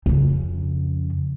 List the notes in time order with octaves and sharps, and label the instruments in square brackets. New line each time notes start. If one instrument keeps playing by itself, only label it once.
[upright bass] F2 C#3